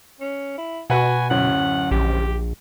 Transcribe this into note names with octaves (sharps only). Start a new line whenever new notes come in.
C#4
E4
B2 F#4 B4 F#5 G#5
D1 F#2 C#4 F#5
A#1 G4